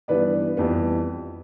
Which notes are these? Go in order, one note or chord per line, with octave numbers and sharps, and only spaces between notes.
G2 E3 B3 B4 D5
F2 E3 G3 B3